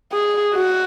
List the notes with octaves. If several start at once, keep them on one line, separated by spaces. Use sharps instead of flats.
G#4
F#4